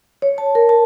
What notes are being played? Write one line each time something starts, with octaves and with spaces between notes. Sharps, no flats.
C#5
A5
A#4
A5